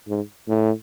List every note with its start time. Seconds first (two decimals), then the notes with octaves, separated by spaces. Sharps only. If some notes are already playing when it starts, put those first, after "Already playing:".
0.09 G#2
0.48 A2